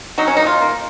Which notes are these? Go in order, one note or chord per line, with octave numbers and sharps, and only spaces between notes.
F#3 D#4
C#4
A#3 D#4
F4
A#3